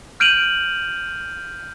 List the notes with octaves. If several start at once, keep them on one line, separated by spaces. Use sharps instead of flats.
F6 G6 D7 D#7 F7 F#7